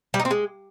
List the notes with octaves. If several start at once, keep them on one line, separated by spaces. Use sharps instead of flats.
G3
D#4
C4
G#3